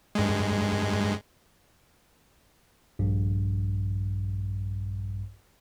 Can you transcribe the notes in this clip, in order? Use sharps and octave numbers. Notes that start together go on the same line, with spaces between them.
G2 G#3
A#1 G2